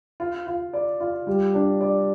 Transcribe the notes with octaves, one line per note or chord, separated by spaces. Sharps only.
F4
F4
D5
F4
G3
D4
D5